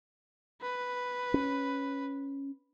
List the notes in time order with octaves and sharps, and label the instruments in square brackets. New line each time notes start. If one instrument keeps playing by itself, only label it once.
[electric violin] B4
[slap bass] C#4